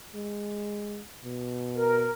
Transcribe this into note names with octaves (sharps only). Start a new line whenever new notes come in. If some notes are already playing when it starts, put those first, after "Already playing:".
G#3
B2
A#4